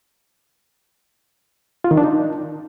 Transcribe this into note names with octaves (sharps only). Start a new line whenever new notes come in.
F4
D#3
D4
D#4